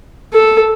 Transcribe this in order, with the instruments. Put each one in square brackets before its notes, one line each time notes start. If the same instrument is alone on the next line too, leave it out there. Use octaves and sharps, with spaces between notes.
[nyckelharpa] A4